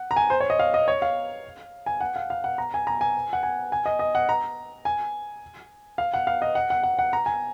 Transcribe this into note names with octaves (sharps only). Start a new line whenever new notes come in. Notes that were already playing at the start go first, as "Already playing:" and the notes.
Already playing: F#5
A#5
G#5
C5
C#5
D#5
F5
D#5
C#5
F5
G#5
F#5
F5
F5
F#5
A#5
G#5
A#5
G#5
F#5
G#5
G#5
D#5
D#5
F#5
A#5
G#5
F5
F#5
F5
D#5
F#5
F#5
F#5
F#5
A#5
G#5